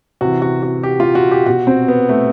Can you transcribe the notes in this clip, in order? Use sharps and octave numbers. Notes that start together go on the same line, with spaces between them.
C3 E3 F#4
F#4
F#4
G4
F4
F#4
G4
B2 F#4
C4
B3
A3